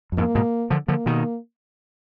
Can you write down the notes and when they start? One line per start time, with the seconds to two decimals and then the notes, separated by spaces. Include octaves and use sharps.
0.12 F#2
0.17 F2 G#2 A#3
0.35 G#2 B2
0.70 D3 F3
0.88 D3 F3 A#3
1.06 B2 D#3